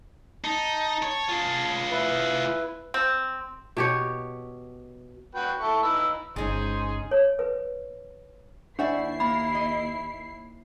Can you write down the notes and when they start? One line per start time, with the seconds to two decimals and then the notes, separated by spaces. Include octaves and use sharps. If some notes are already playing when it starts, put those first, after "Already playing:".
0.44 D#4 A5
1.03 C#5
1.29 F4 G#4
1.91 E4 B4
2.94 C4
3.77 B2 G4 C#5
5.35 F#4 B4 G5
5.60 E4 A4 C#6
5.83 D#4 B4 E6
6.36 G1 C#3 G#3 C#4 D#4 G#4 C5
7.11 C#5
7.39 B4
8.79 D#2 D4 E4 D5 E5 F#5 C7
9.20 A#3 B5
9.55 D#5